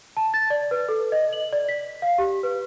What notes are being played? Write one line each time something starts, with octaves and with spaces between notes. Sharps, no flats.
A5
A6
D5
B4
A4
D#5
F#7
D5
B6
F5
G4
B4